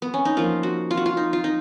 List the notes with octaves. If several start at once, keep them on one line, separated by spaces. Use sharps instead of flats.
B3
C#4
D#4
F3 A#3 F4
F#4
F4
F#4
F4
D#4
F4
D#4